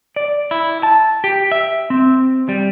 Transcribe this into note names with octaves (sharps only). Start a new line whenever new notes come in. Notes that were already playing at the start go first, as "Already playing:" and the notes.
D5
E4
A5
G4
E5
C4
G3